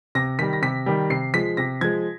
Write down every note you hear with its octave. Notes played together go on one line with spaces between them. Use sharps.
C3 A#6
D#3 G3 B6
A#6
C3 B6
D#3 G3
C3 C7
F3 G#3 B6
C3 A#6
F3 G#3 G#6